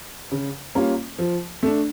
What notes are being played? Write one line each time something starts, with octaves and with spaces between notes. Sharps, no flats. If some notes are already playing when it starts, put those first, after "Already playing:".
C#3
G3 A#3 C#4 F4
F3
A3 D4